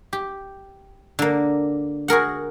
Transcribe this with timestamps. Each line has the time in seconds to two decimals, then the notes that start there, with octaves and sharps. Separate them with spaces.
0.13 G4
1.19 D3 A#3
2.08 F#4 G#4 A#4 F#5